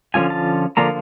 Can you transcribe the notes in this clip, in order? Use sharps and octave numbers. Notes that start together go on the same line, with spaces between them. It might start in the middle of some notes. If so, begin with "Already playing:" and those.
D3 F3 A#3 C#4 F4 G#5
A5
D3 F3 A#3 D4 F4 A#5